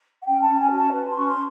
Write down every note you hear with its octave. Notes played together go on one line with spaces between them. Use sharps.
F#5
C#4 G5
A5
C#4
G#5
F#4
A5
B4
C6
C#4 C#6
C6